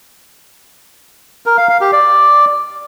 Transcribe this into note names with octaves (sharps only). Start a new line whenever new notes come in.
A#4
F5
F5
G4
D5